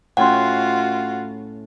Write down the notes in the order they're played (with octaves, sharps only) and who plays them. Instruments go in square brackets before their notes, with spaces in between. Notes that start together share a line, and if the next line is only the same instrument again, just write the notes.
[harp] A2 C#4 [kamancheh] F4 F#4 [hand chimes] F#5 [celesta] G5 C6